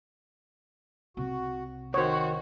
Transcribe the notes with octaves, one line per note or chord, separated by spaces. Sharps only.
C2 C3 F#4
D#3 F#4 C5 C#5